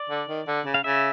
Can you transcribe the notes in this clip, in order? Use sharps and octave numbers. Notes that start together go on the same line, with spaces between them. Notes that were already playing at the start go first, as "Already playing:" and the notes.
Already playing: D5
D3
D#3
D3
C#3
F5
C#3 E5